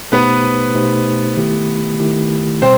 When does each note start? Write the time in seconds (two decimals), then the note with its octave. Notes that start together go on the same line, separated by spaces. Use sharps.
0.12 B2 A3 B3 D#4 G4 B4 C5
0.74 B2 A3 D#4 G4 C5
1.36 D#3 A3 E4 G4
1.99 D#3 A3 E4 G4
2.62 B2 G3 C4 C5